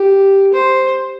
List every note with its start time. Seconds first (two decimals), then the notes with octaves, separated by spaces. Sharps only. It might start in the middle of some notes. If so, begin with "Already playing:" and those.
Already playing: G4
0.54 C5